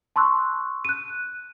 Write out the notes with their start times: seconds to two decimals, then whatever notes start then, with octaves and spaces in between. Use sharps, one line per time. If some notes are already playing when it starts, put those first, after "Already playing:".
0.16 A5 C6 C#6 E6 F#6
0.85 F#6 D#7